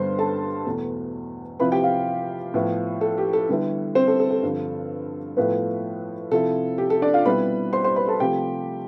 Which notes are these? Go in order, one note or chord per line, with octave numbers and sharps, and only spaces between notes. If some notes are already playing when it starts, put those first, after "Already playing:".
Already playing: G2 D3 G3 B3 C5 C6
A4 A5
E2 B2 A3
C3 F3 C4 E4 B4 B5
G4 G5
F4 F5
A2 F3 B3 E4
A4
G4
A4
D3 G3 B3 E4
C4 C5
A4
A4
A4
G2 D3 F3 C4
A2 F3 A3 B3 E4 B4
C3 F3 C4 E4 A4
G4
A4
D4 D5
F4 F5
B2 G3 C4 E4 B4 B5
C5 C6
C5 C6
B4 B5
A4 A5
C3 F3 A3 G4 G5